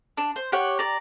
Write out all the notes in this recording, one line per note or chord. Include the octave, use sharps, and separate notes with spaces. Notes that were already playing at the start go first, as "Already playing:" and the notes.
D4
C5
G4 C#5 F#5
D5 A#5